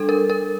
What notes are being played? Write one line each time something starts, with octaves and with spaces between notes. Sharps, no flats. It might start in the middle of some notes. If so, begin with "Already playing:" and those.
Already playing: G3 D4 A4
A#4
A#4